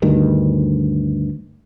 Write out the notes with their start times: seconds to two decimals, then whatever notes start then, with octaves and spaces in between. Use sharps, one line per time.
0.02 D2 G2 D#3